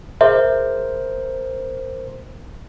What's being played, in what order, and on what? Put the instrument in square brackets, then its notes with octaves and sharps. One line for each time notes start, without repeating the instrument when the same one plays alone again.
[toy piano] G#4 E5 [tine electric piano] A#4 C5